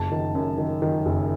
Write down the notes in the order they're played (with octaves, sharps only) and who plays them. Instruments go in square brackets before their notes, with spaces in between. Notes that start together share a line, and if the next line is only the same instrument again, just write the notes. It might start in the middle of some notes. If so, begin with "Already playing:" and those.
Already playing: [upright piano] F#1 A5
D#3
F#2
D#3
D#3
F#1